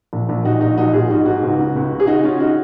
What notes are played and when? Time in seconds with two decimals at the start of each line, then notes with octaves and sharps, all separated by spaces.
0.13 A#1
0.29 A#1
0.45 A#1 D#4 F#4
0.61 A#1 D#4 F#4
0.78 A#1 D#4 F#4
0.88 F#4
0.94 A#1 F4 G#4
1.10 G#2 D#4 F#4
1.26 G#2 D#4 F#4
1.43 C#2
1.59 C#3
1.76 C#2
1.91 C#3
2.00 G#4
2.07 C#3 D#4 F#4
2.24 C#3 C#4 F4
2.40 D#4 F#4